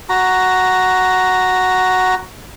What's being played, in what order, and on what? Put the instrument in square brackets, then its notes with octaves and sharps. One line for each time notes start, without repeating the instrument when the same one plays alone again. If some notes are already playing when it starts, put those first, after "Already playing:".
[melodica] F#4 A#5